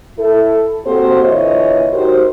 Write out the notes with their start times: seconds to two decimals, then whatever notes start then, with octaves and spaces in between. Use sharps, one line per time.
0.18 E4 A4
0.85 A#3 C4 F#4 G4 A4 C5
1.23 A#2 D3 E3 C#5 D#5
1.92 D#4 F#4 G4 A#4 C5